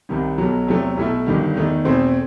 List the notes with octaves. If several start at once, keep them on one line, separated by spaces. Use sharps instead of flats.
C2 C3 D#3 G3 D#4
B1 B2 F#3
E2 C3 F#3 A3
B1 B2 A3 E4
G1 G2 D#3 G3
E2 D#3 A3 D#4
E2 B2 A3 C4